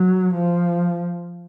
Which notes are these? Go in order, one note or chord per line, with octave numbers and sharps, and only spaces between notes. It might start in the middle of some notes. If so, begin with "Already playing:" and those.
Already playing: F#3
F3